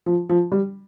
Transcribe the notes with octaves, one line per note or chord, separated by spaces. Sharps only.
F3
F3
G3